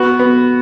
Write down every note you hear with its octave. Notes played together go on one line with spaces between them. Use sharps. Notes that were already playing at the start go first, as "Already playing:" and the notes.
Already playing: B3 F#4
B3